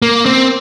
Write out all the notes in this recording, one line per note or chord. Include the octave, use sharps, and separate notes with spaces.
A#3
C4